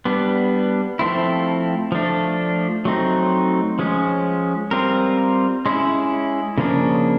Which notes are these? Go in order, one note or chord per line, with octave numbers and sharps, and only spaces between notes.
G3 B3 D4
F3 A3 C4 E4
F3 A3 D4
F#3 A3 C4 D#4
F3 G#3 C#4
G3 C4 F4 A#4
G#3 C#4 E4
C#3 F3 A#3 D4